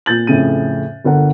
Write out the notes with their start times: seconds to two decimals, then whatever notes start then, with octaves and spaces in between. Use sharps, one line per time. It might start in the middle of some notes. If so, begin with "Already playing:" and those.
0.06 A#2 G6 A6 F#7
0.27 F2 A2 C#3 D#7
1.04 G1 D3 A#4 F#5